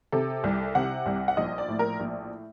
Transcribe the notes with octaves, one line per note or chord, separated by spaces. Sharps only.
C3 A4
C2
C3 F#5
C2
F#5
A#1 D#5
D5
A2
A#4
A#1